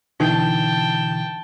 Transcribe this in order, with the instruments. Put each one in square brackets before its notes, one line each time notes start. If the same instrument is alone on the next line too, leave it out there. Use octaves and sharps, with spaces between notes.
[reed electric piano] B2 D3 E3 [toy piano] D#4 [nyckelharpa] G5 A5